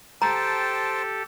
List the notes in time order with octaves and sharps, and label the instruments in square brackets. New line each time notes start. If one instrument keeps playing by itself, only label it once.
[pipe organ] G4 A4 [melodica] C5 G5 A5 [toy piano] A#5